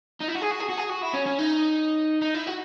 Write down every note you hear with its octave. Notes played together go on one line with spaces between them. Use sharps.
D#4
E4
F#4
G#4
F#4
G#4
F#4
G#4
F#4
E4
C#4
C#4
D#4
D#4
E4
F#4